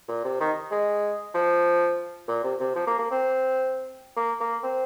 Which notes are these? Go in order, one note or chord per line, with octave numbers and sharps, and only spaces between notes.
A#2
C3
D#3
G#3
F3
A#2
C3
C3
F3
A#3
A#3
C4
A#3
A#3
C4